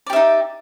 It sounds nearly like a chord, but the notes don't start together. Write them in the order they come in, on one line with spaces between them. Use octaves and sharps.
D5 G4 E5 D#4